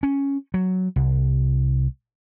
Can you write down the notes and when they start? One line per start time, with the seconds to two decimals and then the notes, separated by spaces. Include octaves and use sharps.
0.03 C#4
0.54 F#3
0.96 C2